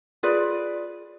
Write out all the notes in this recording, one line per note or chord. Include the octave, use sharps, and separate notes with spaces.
F4 G#4 B4 D5